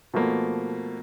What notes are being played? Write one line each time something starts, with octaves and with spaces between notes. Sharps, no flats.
B2 F3 A3 A#3